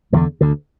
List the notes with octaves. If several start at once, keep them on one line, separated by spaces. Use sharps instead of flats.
E1 E2 D3 E3
D2 D3